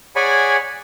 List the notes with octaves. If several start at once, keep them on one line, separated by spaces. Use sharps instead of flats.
G#4 C#5 D5 F#5 G#5 B5